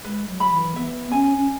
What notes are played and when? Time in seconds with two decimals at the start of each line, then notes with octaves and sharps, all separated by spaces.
0.04 G#3 B4
0.29 F#3
0.40 B5
0.52 E3
0.76 B3 E5
1.12 C#4 G#5
1.38 C#4